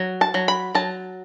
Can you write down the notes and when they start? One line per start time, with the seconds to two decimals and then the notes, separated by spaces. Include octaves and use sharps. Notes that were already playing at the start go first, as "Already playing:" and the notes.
Already playing: F#3
0.21 A5
0.34 F#3
0.48 B5
0.75 F#3 A5